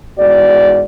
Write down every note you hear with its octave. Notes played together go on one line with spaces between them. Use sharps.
E2 G#2 F#4 D5